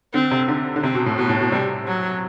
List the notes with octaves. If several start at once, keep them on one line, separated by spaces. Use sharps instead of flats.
D3 C4
C3
D3
D3
C3 C4
B2
A2
B2 B3
A2
B2
C3 G3
F#3